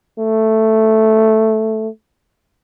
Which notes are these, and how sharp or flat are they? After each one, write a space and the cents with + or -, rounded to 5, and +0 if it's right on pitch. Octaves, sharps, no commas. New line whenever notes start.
A3 +0